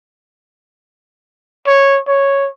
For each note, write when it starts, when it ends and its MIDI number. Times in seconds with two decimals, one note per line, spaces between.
1.67 1.99 73
2.07 2.48 73